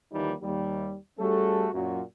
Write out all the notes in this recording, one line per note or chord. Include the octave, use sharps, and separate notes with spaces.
D#2 E3 F3 G3 A#3 D#4
D#2 G3
G3 A3 C#4 F#4 G#4 A4
F#2 A#2 F#4